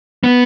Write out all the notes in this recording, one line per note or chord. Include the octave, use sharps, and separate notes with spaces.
B3